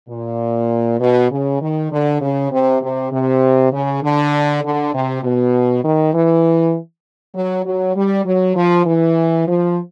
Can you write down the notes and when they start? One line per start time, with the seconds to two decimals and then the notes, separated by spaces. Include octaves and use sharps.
0.09 A#2
1.00 B2
1.31 C#3
1.61 D#3
1.91 D3
2.21 C#3
2.52 C3
2.82 C3
3.11 C3
3.72 C#3
4.03 D3
4.63 D3
4.94 C3
5.23 B2
5.84 D#3
6.14 E3
7.35 F#3
7.65 F#3
7.95 G3
8.26 F#3
8.56 F3
8.86 E3
9.47 F3